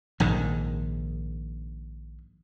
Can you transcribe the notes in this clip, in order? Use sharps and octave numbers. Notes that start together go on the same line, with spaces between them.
A#1 G#2 D#3